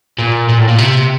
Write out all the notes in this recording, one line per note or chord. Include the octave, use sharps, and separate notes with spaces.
A#2
A#2
A2
A#2
C3